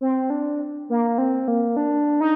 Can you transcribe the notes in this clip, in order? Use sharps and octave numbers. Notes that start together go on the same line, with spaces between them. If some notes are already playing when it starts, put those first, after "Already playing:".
C4
D4
A#3
C4
A#3
D4
D#4